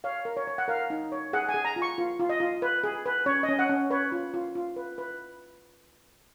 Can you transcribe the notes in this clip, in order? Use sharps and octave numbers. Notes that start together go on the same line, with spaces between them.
C#5 F5
A#4
C#5
C#5
F#5
A#4 F5
D#4
C#5
G#4 F#5
G#5
G#4
A#5
F4
C#6
F4
F4
D#5
F4
B4
G#4
B4
C#4 C#5
D#5
C#4
F#5
C#4
B4 C#5
F4
F4
F4
B4
B4